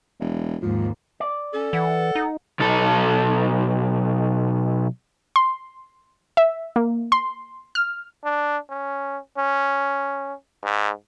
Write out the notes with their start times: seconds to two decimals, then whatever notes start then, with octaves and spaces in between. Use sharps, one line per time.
0.20 E1
0.62 D#2 G#2 F3
1.20 D5
1.53 C#4 A4
1.73 E3 F#5
2.15 D#4
2.59 B1 A4
5.36 C6
6.37 E5
6.76 A#3
7.12 C6
7.75 F6
8.24 D4
8.70 C#4
9.38 C#4
10.64 G#2